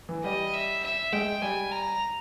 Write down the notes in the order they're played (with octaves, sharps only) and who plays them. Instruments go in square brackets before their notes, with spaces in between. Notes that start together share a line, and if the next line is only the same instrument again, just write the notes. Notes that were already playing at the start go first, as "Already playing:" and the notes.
[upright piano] E3
[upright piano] G3 [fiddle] D#5
[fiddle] E5
E5
[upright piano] G#3 [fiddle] G5
[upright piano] G3 [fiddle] G#5
[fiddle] A#5